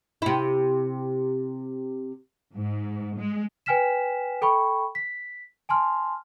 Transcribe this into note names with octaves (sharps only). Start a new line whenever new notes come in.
C3 E4
G#2
G#3
B4 G5 G#5 F6 B6 E7
A4 G5 B5 C#6
B6
G#5 A5 C6 F6